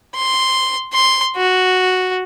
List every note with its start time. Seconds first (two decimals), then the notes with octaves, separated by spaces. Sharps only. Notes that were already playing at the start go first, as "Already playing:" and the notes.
0.16 C6
0.94 C6
1.37 F#4